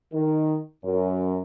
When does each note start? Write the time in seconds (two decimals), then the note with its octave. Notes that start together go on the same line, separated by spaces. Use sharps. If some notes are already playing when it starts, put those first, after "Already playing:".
0.13 D#3
0.84 F#2